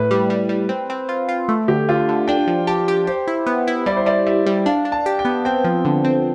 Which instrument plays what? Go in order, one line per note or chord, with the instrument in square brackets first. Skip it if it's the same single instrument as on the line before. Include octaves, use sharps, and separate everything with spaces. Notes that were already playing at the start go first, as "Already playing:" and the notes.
Already playing: [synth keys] A2 [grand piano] B4
[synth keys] G3
G3
G3
C4
C4
F4
F4
A3
[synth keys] D3 [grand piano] G4
[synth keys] D3 [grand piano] F4
[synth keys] D3
[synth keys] D4 [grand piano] G5
[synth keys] F3
[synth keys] G4 [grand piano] A5
[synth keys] G4
[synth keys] G4 [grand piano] C5
[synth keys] E4
B3
E4
[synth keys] G3 [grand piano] D5
[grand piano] C5
[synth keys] G3 [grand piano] D5
[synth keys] G3 [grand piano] E5
[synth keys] G3
[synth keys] D4 [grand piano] F5
[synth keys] D4
[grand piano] A5
[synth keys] G4
[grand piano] G5
[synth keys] B3
[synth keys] C4 [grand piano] G5
[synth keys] F3
D3
C4